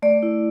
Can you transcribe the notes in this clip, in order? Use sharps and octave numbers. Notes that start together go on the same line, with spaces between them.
A3 D5
E4